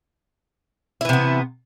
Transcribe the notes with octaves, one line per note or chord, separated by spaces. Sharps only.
C3 E3 B3 E4